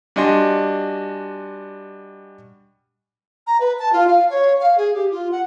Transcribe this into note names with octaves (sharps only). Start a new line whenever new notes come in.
G3 D4 F#4 D#5 G#5 C6
A#5
B4
A5
F4
F5
C#5
F5
G#4
G4
F4
F#5